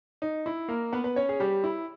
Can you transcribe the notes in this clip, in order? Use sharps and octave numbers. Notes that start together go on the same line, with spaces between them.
D#4
E4
A#3 A#4
B3 B4
B4
C#4 C#5
G#4
G3 G4
E4